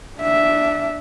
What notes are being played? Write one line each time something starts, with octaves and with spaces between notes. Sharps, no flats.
D4 E5